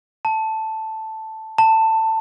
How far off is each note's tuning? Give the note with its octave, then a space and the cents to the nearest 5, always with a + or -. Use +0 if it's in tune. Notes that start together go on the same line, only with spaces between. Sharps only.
A5 +0
A5 +15